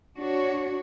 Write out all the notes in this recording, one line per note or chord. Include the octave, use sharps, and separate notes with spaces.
D4 F#4 C#5